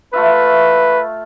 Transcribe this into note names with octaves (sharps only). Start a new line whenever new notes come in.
A3 F4 B4 E5